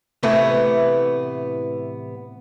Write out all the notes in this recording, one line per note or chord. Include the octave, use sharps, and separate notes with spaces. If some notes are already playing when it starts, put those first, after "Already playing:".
A2 C3 E3 A3 B3